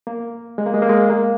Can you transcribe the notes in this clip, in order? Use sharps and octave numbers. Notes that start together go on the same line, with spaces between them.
A#3
G#3
A#3
G#3
A#3
G#3
A#3